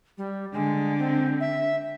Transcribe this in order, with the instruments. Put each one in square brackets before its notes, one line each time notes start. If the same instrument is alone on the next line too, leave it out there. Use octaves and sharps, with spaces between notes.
[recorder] G3
[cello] D3 [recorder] G#3
[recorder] C4
E5